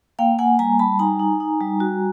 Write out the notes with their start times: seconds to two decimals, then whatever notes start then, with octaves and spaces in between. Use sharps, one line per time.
0.19 A#3 F5 G5
0.39 A#3 F#5 G#5
0.59 G3 G#5 A#5
0.79 G3 A5 B5
0.99 D#4 G#5 A#5
1.20 D#4
1.40 D#4
1.61 G3
1.80 F#4